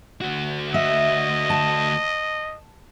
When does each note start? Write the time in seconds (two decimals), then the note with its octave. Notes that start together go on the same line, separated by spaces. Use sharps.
0.22 D2 F#4
0.74 D#5 E5
1.50 A5